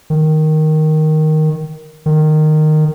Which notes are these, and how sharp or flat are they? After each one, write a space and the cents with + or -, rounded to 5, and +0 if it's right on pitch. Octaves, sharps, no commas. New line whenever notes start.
D#3 +0
D#3 -15